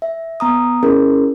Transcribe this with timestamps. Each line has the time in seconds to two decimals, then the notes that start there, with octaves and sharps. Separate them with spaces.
0.02 E5
0.40 B3 A#5 D#6
0.83 C#4 E4 G#4 A#4